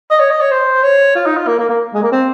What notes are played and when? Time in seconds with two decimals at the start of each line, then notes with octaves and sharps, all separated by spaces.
0.11 D#5
0.20 C#5
0.30 D#5
0.41 C#5
0.51 C5
0.83 C#5
1.16 F4
1.26 D#4
1.37 F4
1.47 A#3
1.59 A#3
1.69 A#3
1.94 G#3
2.03 A#3
2.12 C4